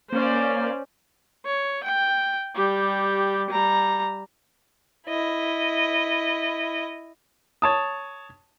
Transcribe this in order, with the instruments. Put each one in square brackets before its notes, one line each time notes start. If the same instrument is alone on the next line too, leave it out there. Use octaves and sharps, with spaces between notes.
[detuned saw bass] A#3 [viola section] C#4 C5 D5
[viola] C#5
G5
G3 G4
G3 A#5
[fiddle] E4 D#5
[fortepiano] C#5 A5 D#6